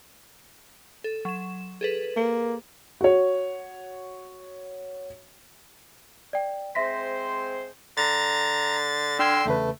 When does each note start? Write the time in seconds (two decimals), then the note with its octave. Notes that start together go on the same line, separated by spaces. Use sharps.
1.04 A4
1.25 F#3 E7
1.81 G#4 A4 B4
2.16 A#3
3.01 F#4 C#5
6.33 D5 G5
6.75 G#3 C4 C5 E5 A#6 B6
7.97 D3 A#5 A6
9.19 D4 G5 C6 E6 F6 G#6
9.46 E2 C#3 A3 B4